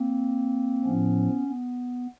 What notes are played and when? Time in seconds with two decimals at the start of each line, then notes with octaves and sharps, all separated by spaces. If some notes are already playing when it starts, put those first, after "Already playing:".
Already playing: A#3 C4
0.84 A2 F3 B3 C#4
1.47 B3